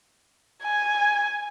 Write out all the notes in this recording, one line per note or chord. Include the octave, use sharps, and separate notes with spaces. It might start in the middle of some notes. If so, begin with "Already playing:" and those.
G#5